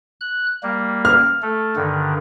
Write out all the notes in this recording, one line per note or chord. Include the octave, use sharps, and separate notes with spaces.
F#6
G3 A#3
F6
A3 A4
G2 D3 D#3